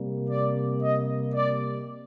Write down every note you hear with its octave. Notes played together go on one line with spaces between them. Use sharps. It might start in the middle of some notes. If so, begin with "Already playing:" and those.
Already playing: C3 G3 A#3
D5
D#5
D5